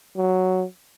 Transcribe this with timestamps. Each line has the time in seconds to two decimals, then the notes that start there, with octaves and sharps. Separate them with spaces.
0.17 F#3